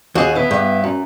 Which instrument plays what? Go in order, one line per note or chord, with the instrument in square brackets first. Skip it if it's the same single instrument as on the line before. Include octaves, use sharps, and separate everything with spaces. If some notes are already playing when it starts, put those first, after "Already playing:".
[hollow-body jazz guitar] D#2 [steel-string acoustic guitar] F#4 G#4
[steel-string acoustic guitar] B3 E4
[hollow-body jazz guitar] G2
[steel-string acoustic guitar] F#2